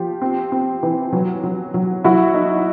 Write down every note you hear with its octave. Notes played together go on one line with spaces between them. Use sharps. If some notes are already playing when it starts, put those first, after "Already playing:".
Already playing: F3 F4 G4
C4
C4
E3
F#3
F#3
F#3
F#3 E4 F#4
D#4